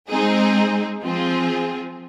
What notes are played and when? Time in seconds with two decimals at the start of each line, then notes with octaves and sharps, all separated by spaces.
0.10 G#3 C4 D#4 G#4
1.03 F3 C4 F4 G#4